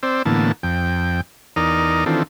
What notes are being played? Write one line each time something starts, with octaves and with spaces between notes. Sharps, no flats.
C4 C5 D5 E6
A2 D3 E3 A#3 B3 A5
F2 G5
E2 D#4 A#4 D5 A#5 D#6
D#3 E3 C4 D4 F4 A4